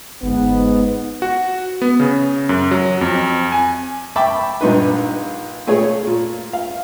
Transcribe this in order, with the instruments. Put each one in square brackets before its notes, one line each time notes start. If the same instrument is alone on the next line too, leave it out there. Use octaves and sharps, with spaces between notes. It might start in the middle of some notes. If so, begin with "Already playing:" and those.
[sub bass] G1 [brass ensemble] G#2 B3
[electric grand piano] F#4
B3
C#3
F#2
F#3
F2
G#5
[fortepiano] E5 G5 A5 B5 C#6 D6
A#1 G2 D#4 B4
A#2 A3 G#4 C#5
A#2
F5